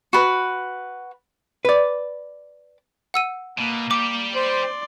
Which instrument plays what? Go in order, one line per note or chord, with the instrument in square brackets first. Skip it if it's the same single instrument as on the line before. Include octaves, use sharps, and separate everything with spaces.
[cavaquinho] F#4 B4
[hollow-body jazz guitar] B4 D5
[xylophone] F#5 E6 D#7
[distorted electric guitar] B2 [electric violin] A#3
[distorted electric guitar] G3 G4 [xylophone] D6
[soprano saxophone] C5 [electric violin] D5 C6